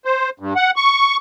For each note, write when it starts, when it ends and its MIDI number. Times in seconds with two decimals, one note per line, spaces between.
0.05 0.30 72
0.40 0.54 43
0.56 0.71 78
0.76 1.17 85